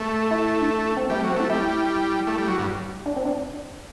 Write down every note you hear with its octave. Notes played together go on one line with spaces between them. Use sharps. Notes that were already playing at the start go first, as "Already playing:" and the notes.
Already playing: A3
E4
D4
E4
C4
G3 A3
F#3
C4
A3 E4
G3 E4
A3
G3
F#3
G2
D4
C4
D4